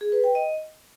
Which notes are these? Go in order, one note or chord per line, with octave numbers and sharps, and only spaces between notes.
G#4
B4
G5
D#5